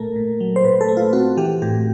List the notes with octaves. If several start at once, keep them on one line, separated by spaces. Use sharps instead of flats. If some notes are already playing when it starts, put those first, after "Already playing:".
Already playing: A#2 A3 A4 A#4
A#2
F#3
C5
A#2 B4
A4
A3
F4
C4 F#4
E3 G4
A2 G4